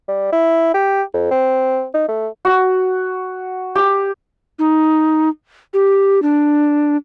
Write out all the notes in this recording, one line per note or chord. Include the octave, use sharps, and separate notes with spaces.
G3
E4
G4
F2
C4
D#4
A3
F#4
G4
D#4
G4
D4